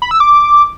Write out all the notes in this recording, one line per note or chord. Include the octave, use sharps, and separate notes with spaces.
B5
E6
D6